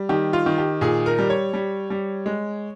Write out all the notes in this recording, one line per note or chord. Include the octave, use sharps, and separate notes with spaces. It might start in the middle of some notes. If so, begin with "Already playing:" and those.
Already playing: G3
D#3 G4
F4
D#3
G4
A#2 G#4
A#4
G3
C#5
G3
G3
G#3